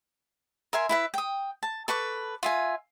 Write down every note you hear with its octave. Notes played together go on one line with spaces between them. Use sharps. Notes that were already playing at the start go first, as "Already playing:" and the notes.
A#4 E5 G#5 C6
E4 B4 E5
G5 D#6
A5
A4 B4 C#6 D6
F4 E5 G#5